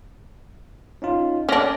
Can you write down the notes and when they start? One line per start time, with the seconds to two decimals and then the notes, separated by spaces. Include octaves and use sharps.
1.02 C#4 D#4 F4
1.49 C#4 D4 D6 A#6